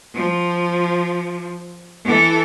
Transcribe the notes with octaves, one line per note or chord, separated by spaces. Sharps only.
F3
E3 A4